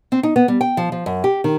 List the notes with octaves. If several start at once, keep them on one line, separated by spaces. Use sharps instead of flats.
C4
D#4
B3
G3
G5
F3
F3
F#2
G4
D#3